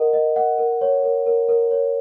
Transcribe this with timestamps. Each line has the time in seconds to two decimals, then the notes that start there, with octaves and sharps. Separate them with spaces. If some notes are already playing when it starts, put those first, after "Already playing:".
Already playing: A#4 D#5 F#5
0.13 D#5
0.36 F#5
0.58 A#4
0.81 C#5
1.04 A#4
1.26 A#4
1.49 A#4
1.71 C#5